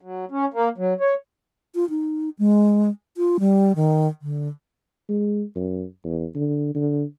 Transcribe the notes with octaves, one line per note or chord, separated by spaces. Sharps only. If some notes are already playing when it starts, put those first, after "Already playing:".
F#3
C#4
A#3
F#3
C#5
F4
D#4
G#3
F4
G3
D#3
D3
G#3
F#2
E2
D3
D3